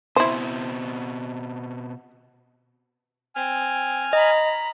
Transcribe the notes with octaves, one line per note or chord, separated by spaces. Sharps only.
B2 C4 E4 C5
C4 G#5 F6
D#5 A#5 B5